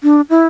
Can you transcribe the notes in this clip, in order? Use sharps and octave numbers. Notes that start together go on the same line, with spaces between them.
D4
E4